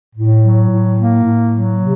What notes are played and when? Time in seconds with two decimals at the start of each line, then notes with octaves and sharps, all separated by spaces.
0.15 A2
0.43 F#3
0.70 A2
0.98 A#3
1.24 A2
1.53 F#3
1.79 C3